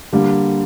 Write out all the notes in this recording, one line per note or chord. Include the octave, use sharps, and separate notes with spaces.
D3 G3 A#3